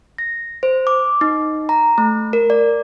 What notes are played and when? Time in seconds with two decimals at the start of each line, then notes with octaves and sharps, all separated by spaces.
0.18 A#6
0.63 C5
0.87 D6
1.21 D#4
1.69 A#5
1.98 A3
2.33 A#4
2.50 D5